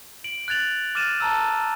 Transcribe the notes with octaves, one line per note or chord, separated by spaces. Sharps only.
D7 F#7
F#6 G#6 A6 F7 F#7
D6 F6 A6 D#7 E7
A5 A#5 E6